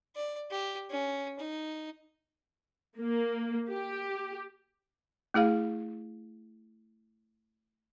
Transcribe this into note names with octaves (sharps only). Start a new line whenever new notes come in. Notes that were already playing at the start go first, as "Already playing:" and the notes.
D5
G4
C#4
D#4
A#3
G4
A3 E4 G#4 F5